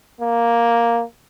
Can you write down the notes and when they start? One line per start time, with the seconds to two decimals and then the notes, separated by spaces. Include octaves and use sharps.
0.21 A#3